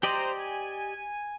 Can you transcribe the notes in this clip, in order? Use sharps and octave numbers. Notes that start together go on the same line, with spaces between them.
G4 C5 D5 D#5 A#5
G#5